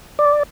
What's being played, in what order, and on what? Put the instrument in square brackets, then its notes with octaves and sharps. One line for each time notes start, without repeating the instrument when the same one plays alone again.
[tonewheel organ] D5